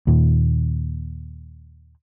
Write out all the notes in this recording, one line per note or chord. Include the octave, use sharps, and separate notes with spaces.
D#2 A#2